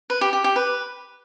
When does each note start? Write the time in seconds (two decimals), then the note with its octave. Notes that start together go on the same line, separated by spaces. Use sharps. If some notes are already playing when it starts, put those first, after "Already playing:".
0.10 B4
0.21 G4
0.33 G4
0.44 G4
0.56 B4